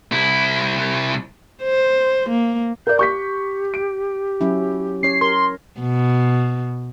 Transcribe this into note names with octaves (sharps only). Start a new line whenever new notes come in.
C2 E4
C5
A#3
A#4 D5 G6
G4 C#6 G6 B6
D7
F#3 C#4 E4
C#4 C#5 C7
A#4 C6
B2